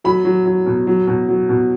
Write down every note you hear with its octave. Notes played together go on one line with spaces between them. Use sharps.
F#3 B5
F#3
F#3
B2
F#3
B2
F#3
B2